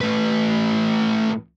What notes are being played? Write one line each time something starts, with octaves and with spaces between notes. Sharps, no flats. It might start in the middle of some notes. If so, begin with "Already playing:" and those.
A2 B4